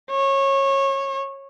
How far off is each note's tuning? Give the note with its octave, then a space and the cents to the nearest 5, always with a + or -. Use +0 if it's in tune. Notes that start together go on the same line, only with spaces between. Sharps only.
C#5 -25